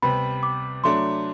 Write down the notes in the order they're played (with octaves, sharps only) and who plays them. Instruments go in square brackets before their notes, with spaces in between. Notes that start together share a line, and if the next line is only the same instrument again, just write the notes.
[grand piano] C3 G3 B3 [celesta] B5
[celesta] D6
[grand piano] F#3 A3 D4 [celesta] C6